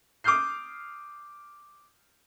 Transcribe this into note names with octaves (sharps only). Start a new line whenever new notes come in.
D6 D#6 F6 G6 C7